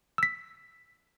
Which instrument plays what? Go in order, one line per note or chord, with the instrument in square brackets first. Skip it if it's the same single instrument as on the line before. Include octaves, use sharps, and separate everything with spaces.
[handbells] E6 B6